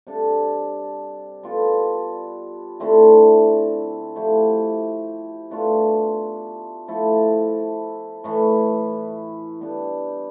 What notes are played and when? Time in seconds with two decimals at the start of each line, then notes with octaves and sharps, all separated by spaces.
0.07 C3 G3 D4 A4
1.43 G3 B3 F4 A4
2.80 D3 A3 C4 E4
4.16 F3 A3 E4 G4
5.51 B2 A3 D4 F4
6.88 F3 A3 E4 A4
8.24 A2 E3 A3 E4
9.60 G3 B3 D4 G4